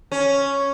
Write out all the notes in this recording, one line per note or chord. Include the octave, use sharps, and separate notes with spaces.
C#4